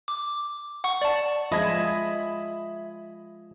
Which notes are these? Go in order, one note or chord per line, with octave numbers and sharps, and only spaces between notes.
D6
F#5 C#6
D5 A5
F3 G#3 D#5 E5 B5 G#6